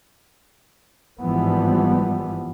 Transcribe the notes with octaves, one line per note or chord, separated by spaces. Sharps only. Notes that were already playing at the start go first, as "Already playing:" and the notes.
G#1 G2 E3 F3 G3 B3